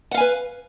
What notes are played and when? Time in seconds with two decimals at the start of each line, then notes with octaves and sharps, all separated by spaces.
0.11 F#5
0.14 F5
0.17 G#5
0.20 B4